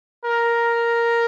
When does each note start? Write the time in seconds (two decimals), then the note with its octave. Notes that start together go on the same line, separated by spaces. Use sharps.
0.25 A#4